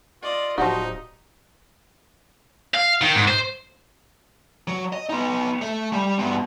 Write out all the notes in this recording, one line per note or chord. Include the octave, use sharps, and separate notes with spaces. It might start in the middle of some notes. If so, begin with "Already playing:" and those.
F4 D5 D#5
D1 F3 D#4 F#4 G4
F5
D#3
G#2
C5
F#3
D#5
B3 D#4
A3
G3
G2 B2